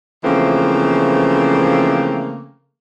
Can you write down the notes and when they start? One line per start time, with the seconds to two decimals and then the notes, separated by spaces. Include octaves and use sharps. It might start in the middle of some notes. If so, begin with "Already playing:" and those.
0.24 C#3 E3 F3 A3 A#3 C4